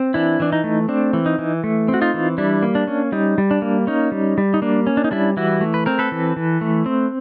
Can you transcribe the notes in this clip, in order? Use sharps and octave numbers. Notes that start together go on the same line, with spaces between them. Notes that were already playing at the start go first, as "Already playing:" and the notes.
Already playing: C4
E3 D4 E4
E3 D4
D#4
A3
C4 D4
E3
D#4
E3
A3
C4
F#4
D#4 F4
E3
G3 D4 E4
A#3
D4
C#4
G3 D#4
G3
D4
A#3
C#4 D#4
G3
G3
D#4
A#3 D4
C#4
D4
D#4
G3 D4 E4
E3 E4 F#4
A3
B4
C4 A#4
A4 B4
E3
E3
A3
C4